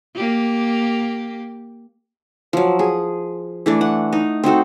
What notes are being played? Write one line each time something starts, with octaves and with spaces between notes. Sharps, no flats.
A#3 G4
F3 F#3
G#4
E3 A3 D4
F#5
D#4
C4 D#4 F#4 A4